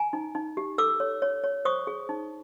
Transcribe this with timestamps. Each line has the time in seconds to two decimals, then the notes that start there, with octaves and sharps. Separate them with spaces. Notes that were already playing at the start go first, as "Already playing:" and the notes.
Already playing: G#5 A#5
0.13 D#4
0.35 D#4
0.57 G4
0.78 A4 D6 E6
1.00 C#5
1.22 C#5
1.44 C#5
1.65 C5 C#6 D#6
1.87 G#4
2.09 D#4